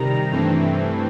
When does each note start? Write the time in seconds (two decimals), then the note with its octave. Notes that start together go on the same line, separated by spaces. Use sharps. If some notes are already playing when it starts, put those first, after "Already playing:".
Already playing: C3 D#3 G3 A#5
0.31 G2 E3 A3 C4